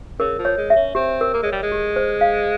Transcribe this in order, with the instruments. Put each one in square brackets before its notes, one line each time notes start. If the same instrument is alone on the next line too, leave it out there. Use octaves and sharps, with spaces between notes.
[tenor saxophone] C#3 [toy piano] A#4
[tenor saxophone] F3
[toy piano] C#5
[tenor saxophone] G#3
[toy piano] E5
[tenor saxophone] C#4
[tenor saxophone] C4 [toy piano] G4
[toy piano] A#4
[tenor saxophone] A#3
[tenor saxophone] G#3 [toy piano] C#5
[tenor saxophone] G3
G#3
[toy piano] G4
C5
F5